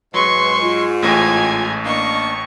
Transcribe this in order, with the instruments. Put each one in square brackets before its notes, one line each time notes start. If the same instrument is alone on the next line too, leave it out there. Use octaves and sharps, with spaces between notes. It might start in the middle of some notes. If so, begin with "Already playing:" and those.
[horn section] G#2 [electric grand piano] F#3 [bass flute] B4 [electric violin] C6 C#6
[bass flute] F4
[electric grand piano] A1 A2 A#6 [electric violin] G#5 G#6
[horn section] A#3 D4 [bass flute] D#5 [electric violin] C#6